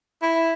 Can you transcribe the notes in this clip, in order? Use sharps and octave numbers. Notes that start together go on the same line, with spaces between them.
E4